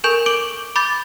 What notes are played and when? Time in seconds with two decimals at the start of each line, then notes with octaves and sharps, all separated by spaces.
0.04 A4 A#4 G#5 C#6 G6
0.26 D6 D7 F#7 G7
0.76 B5 D6 G6 A6